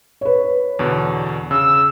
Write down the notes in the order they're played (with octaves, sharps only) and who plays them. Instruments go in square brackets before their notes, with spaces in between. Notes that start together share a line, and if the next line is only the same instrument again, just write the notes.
[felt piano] B4 C#5
[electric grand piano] E2 B2 D3
[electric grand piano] C#3 [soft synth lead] E6